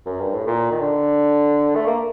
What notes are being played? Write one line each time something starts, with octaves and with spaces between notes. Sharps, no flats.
F#2
G2
A2
A#2
D#3
D3
A3
A#3